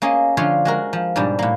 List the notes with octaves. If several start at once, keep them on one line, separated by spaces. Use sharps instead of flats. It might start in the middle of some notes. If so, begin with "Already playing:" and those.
A#3 C#4 G#4 D#5
D3 F3 F4 C#5 C6
G#3 F#4 A#4
F3
G#2 B2 G3 D4
A2 A#3